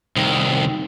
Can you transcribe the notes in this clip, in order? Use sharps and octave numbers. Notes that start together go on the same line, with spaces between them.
C2 D#3